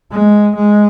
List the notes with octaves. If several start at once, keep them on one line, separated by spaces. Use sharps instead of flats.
G#3
G#3